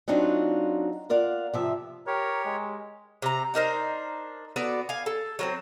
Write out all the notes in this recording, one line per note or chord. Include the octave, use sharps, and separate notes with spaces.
F#3 C4 D4 D#4 F4 F#4
F4 A#4 D5 F5 F#5
C3 F3 E5
G4 A#4 C#5
G#3
C3 A#5
D4 D#4 A#4 C5
B3 F#4 A4 D5
F5 G#5
A4
F#3 A#3 C4